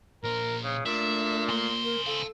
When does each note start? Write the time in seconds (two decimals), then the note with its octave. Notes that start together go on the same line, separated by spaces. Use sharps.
0.23 A#2 A#4 C5
0.63 C#3
0.86 A#2 A3 D4 E5
1.49 C#3 A#3 C5
1.84 A#4
2.07 A4 F5 A5